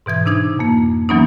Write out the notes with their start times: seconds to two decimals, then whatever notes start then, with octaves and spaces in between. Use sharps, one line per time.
0.06 G#2 B2 E3 G#6
0.26 C3 D4 D#4 G#6
0.59 F2 A#3
1.09 E3 F#3 A#3 B3 C#4 D#4